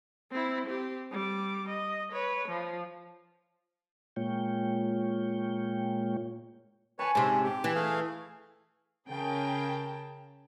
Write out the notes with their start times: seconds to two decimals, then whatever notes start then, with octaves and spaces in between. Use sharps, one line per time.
0.31 C4 E4
0.66 C4 G4
1.11 G3 D6
1.69 D#5
2.12 B4 C#5
2.48 F3
4.16 A#2 G#3 A#3 F4 C#5 G5
6.99 B4 C#5 G#5 A5
7.15 G#2 C3 C#4
7.44 G4
7.64 E3
7.75 A3 G#4 F5
9.09 C#3 G#4 A#4 G5 A5